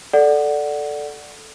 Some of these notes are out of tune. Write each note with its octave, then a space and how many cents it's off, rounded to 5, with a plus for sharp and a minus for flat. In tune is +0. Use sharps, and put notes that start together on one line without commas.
A4 +0 D5 +0 F#5 +0